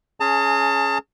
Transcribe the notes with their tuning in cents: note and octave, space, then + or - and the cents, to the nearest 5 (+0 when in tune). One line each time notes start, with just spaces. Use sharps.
C#4 +0 G#4 +15 A5 +40